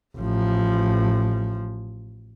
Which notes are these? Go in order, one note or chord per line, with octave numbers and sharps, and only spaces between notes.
A1 F3